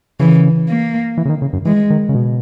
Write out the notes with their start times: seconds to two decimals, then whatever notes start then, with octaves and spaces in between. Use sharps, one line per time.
0.20 C#3 E3
0.69 A#3
1.18 E3
1.25 C#3
1.30 D#3
1.42 C#3
1.53 F#2
1.65 E3 G#3
1.90 D#3
2.09 C#3
2.15 B2